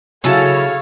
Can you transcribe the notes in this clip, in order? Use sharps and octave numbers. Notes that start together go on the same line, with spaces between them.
C#3 F#3 E4 F#4 A4 C#5 F5 A5